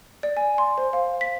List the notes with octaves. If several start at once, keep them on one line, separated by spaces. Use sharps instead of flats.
D5
G#5
C6
C5
F5
B6